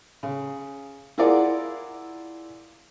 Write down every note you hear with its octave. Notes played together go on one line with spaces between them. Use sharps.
C#3
E4 F4 G#4 A#4 D5 F#5